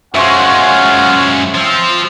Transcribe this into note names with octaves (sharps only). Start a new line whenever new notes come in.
F#2 G#3 C#4 F4 C5 C#5 E5 F#5
F3 C4